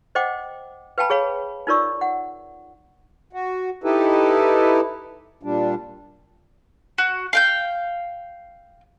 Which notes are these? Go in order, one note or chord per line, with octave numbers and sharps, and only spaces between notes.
C5 D#5 F#5 G5 D6
B4 F5 G5 A5 B5
G#4 C#5 F5 B5
D#4 F4 A#4 D5 C#6 E6
F#5
F#4
D#4 E4 G4 A4 B4
A#2 G3 D4
F#4
F5 G5 G6